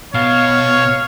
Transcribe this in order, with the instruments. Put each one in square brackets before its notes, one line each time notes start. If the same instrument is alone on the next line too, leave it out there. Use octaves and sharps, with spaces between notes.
[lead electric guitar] B2 [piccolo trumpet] C#5 [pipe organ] F5